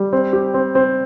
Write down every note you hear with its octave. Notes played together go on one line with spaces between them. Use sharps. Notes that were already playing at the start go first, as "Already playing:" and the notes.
Already playing: G3
C4
G4
C4
C4